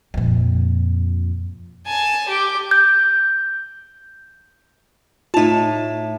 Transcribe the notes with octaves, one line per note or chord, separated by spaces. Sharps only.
F2 A#2
G#5 A5
G4 D6
G6
A2 D#4 F4 A5